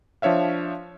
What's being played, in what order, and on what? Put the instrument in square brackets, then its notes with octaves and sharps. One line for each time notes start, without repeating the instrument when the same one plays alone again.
[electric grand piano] F3 D4 C#5 E5 F5